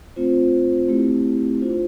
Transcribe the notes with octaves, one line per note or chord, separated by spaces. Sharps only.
A3 C4 F4 C5
A3 C4 E4 G4
D4 F4 C5